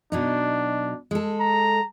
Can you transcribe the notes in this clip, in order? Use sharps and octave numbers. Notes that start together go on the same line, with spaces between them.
B2 F#3 D4 D#4
G#3 A4
A#5